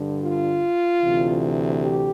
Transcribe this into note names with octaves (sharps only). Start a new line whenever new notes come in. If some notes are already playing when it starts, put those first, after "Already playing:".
Already playing: G2 D3
F4
D2 C3 E3
G4